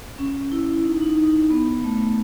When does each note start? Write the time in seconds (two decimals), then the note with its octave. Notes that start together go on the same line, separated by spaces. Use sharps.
0.18 C#4
0.52 E4
0.73 E4
0.85 D#4
1.01 D#4
1.17 D#4
1.51 B3
1.84 A3